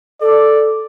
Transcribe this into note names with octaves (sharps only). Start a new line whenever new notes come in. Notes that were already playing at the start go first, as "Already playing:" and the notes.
A4 D5